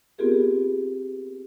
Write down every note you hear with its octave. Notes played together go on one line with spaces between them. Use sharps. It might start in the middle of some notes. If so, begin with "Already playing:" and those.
B3 C4 F4 G4 G#4 A#4